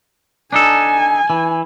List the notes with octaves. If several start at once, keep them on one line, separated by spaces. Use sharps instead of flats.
D4 D#4 A4 G#5
E3